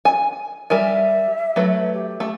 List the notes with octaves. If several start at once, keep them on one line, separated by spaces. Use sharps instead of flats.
G#5
G3 A#4 E5 G#5
F#3 A3 B4
G4
A3